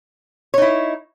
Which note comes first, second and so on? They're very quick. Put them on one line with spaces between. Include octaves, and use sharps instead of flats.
C#5 D#4 E4